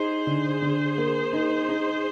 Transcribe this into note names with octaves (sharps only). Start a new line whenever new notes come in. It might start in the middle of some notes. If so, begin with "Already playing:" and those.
Already playing: D#4 G#4 C5
D3
D3
A#3
D#4
D#4